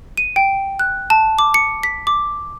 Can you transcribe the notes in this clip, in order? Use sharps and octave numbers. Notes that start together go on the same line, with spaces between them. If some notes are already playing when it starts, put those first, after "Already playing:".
D#7
G5
F#6
A5
D6
C#7
B6
D6